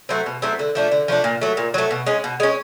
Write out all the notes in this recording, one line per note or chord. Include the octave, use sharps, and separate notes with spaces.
F#3 A3 C4
B2
F#3 A3 C4
D3
F3 A3 D4
D3
F3 A3 D4
A#2
F#3 A3
A#2
F#3 A3
B2
G#3 C#4
B2
G#3 C#4